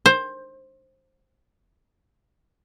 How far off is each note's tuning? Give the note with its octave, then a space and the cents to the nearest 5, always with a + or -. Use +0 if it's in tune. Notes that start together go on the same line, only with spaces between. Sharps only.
C5 +15